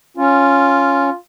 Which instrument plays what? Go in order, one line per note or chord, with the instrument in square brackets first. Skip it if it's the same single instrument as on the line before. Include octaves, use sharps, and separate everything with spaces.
[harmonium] C#4 [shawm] F4